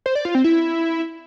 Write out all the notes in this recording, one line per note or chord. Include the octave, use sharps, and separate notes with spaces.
C5
D5
F4
C4
E4